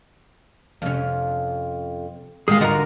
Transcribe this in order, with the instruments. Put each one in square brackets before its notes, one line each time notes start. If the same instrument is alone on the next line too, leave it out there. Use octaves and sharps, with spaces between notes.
[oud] F2 C#4 [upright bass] C3
[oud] D#3 G#3 F5 [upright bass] G3 [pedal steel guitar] G#4
[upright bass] G#1 D#2 [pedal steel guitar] D3 A#4 A#5 [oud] F4 F#4 D#5